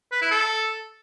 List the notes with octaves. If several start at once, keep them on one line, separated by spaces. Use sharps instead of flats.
B4
E4
A4